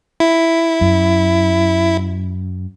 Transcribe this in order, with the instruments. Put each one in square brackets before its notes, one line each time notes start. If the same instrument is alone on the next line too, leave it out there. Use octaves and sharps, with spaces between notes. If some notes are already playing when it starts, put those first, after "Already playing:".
[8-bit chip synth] E4
[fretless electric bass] F#2